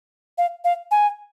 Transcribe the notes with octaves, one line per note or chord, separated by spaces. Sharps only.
F5
F5
G#5